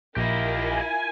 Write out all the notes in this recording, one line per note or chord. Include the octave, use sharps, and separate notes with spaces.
A#1 E4 F4 G4 A#4 D#5
G#5